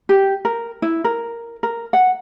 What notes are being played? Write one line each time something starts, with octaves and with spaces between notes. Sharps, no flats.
G4
A#4
E4
A#4
A#4
F#5